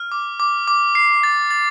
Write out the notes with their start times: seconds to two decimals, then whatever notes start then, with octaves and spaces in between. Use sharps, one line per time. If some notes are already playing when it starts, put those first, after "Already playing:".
Already playing: F6
0.12 D6
0.40 D6
0.68 D6
0.95 C7
1.23 A6
1.51 A6